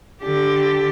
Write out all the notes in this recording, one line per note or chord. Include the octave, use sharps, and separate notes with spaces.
D3 G4